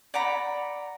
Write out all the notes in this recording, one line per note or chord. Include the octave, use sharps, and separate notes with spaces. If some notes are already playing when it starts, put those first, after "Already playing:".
D5 F#5 A#5 B5